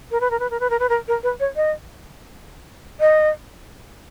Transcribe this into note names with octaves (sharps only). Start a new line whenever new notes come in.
A#4
B4
A#4
B4
A#4
B4
A#4
B4
A#4
A#4
B4
C#5
D#5
D#5